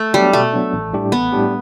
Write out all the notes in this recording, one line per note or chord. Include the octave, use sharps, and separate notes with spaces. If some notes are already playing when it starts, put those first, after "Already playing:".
Already playing: A3
F#3 G3 B3 D4
B2 A3
F#3 B3 D4
A1
A2 G3 D4 G4
A1 B3
A2 G3 D4 G4